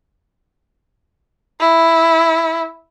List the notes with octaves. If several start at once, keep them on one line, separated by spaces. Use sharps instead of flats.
E4